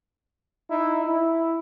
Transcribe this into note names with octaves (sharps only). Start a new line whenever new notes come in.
D#4 E4
E4